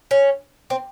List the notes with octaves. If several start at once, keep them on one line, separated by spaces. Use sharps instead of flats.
C#4
C4